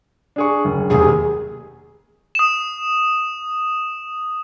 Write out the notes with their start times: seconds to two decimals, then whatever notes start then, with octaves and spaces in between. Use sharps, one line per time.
0.36 D4 G#4 C#6
0.65 F#1
0.90 F1 D#2 G#4
2.35 D#6 E7